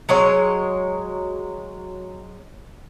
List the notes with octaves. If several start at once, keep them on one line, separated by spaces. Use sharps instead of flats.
F#3 G#3 C#5